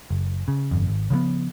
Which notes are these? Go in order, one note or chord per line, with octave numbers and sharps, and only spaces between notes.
F#1
C#3
G1 F2
G#1
C#3 F3 G3 B3